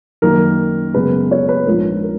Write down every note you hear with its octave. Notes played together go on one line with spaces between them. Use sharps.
F#2 D#3 A#3 A#4
F#2 C#3 G#3 B3 B4
C#5
B4
A#1 G#2 F3 A#4
A#4